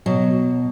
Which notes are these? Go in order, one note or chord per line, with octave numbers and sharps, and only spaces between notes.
B2 F#3